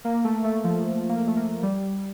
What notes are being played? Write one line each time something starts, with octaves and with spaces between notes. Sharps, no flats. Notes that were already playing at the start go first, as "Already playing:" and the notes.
A#3
A3
A3
F3
A#3
A3
A#3
G3